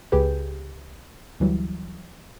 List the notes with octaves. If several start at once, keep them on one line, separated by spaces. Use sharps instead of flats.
C#2 G4 G#4 B4 G6
D2 E3 F#3 G3